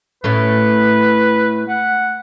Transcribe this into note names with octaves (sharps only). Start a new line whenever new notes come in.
A2 A3 C#4 B4
F#5